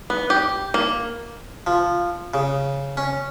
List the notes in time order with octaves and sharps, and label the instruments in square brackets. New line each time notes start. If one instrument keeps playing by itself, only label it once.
[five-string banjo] B3
G4
A#3
[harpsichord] F3
C#3
C#4